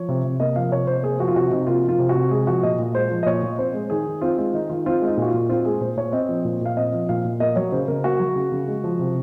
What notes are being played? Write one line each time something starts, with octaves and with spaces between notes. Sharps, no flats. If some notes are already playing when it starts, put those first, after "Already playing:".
Already playing: F3 C#5
C3
C3
A#3 D#5
F3 F5
C3 C#5
C3 C5
A#3 G#4
F3 F#4
F4
C3 F#4
C3 D#4
A#3 F4
F3
F4
C3
F#4
C3
G#3 G#4
F3 F#4
A#2 D#5
A#2
G#3 C5
F3
D#5
A#2 C#5
A#2
C4 C5
G#3
D#3 G#4
D#3
C4 F4
G#3 F4
D#3 D#4
D#3 F4
C4 F4
G#3
D#4
A#2 F#4
F4
A#2
C4 F4
G#3 G#4
A#2 C5
A#2 C#5
C4 D#5
F3
A#2
A#2 F5
C4 D#5
F3
A#2 F5
A#2
A#3 D#5
F#3 C#5
C#3 C5
C#3 A#4
A#3 F#4
F#3
C#3
C#3
G#3
F3
C3